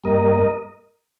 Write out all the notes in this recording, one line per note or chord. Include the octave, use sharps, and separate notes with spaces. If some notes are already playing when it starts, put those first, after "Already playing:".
G2 G3 A#3 A#4 D#5